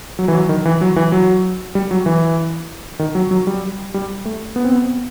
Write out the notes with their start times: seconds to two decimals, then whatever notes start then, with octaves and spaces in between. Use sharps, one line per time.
0.19 F#3
0.28 E3
0.34 F#3
0.49 D#3
0.65 E3
0.81 F#3
0.96 E3
1.12 F#3
1.75 G3
1.91 F#3
2.06 E3
2.99 D#3
3.15 F#3
3.31 F#3
3.47 G3
3.94 G3
4.25 A3
4.56 B3
4.65 C4
4.72 B3